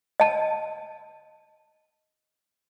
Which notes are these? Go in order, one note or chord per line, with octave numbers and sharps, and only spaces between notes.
D#5 A5